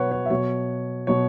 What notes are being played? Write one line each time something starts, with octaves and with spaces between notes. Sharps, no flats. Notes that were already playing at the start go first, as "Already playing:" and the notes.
Already playing: B2 F#3 B4 C#5 F#5
C#5
E5
B2 F#3 C#5
B2 F#3 C#5